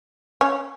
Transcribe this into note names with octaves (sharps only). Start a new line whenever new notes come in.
C#4